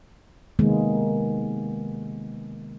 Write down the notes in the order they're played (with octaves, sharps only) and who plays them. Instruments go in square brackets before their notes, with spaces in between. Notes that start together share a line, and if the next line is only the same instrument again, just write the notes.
[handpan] C3 D#3 G#3 A#3 B3